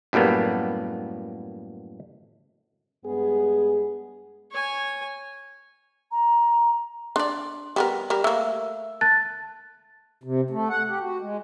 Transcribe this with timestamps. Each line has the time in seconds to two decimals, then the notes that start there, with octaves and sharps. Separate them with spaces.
0.13 F#2 A2 G3 A#3 B3
3.04 G2 G#3 B3 G#4
4.52 C#5 G#5
6.11 A#5
7.16 D4 D5 C6
7.76 G3 B3 A#4
8.10 G3 A#4
8.24 A3 A#3 E5 E6
9.01 A5 F#6 A6
10.24 C3
10.50 A3
10.69 F#5
10.88 G4
11.00 F#4
11.20 G#3